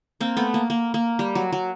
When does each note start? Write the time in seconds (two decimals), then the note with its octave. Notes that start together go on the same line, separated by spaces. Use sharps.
0.20 A#3 C4
0.37 A3 B3
0.54 A#3
0.70 A#3
0.94 A#3
1.19 G3
1.35 F#3
1.52 F#3